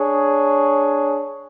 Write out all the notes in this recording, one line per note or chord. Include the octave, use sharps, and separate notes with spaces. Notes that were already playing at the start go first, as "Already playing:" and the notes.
Already playing: D4 G#4 C#5